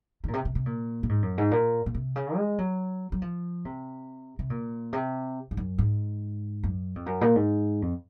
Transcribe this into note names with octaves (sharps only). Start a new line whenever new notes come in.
D#3
A#2
C3
C3
C3
A#2
A#2
G#2
F#2
G#2
A#2
A#2
C3
C#3
G#3
F#3
F#3
F3
C3
C3
A#2
C3
G#2
F#2
G#2
F#2
F2
F#2
A#2
G#2
F2